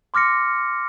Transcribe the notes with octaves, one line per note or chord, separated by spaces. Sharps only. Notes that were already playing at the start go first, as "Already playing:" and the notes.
C6 D6 F6 A#6 C#7